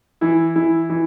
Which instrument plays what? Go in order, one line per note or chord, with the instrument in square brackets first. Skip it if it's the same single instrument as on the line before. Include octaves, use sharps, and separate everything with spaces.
[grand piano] E3 E4
E3 E4
E3 E4